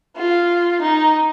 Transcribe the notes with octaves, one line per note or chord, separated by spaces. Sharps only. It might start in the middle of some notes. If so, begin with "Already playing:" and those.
F4
D#4